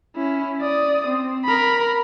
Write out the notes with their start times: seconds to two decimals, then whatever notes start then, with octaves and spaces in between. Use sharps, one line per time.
0.16 C#4 E4
0.61 D5 D#6
1.07 C4
1.44 A#4 B5